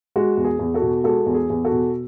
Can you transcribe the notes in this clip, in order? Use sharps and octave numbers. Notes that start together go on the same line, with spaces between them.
G#3 F#4
E2
G#4
E2
F#4 A4
B2
G#3 F#4 A4
E2
G#4
E2
F#4 A4
B2